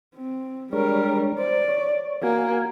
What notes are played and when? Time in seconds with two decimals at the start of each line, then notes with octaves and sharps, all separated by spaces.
0.16 C4
0.73 G3 G#3 D4 A#4 C#5
1.38 C5 D5
1.69 C#5
2.23 A#3 F#4 G#5